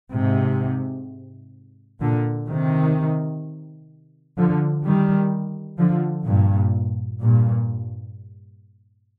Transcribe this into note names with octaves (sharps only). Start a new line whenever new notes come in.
G#2 C3
A#2 D3
C3 D#3
D3 F3
D#3 G3
D3 F3
G2 A#2
G2 A#2